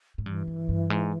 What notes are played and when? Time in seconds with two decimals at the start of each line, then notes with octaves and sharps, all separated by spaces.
0.18 G#2
0.26 G2 E3
0.48 G2
0.69 G2
0.90 G#2